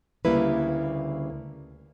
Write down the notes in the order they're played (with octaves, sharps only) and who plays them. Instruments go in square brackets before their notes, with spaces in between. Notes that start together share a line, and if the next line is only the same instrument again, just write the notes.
[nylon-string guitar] D2 C#3 G3 A#3 E4 B4